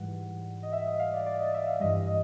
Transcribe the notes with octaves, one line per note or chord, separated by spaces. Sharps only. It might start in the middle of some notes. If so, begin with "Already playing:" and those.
Already playing: G#2 E3 G3 F#5
D#5
E5
D#5
F5
D5
D5
D#5
E5
F5
G2 E3 G3 D#5
D#5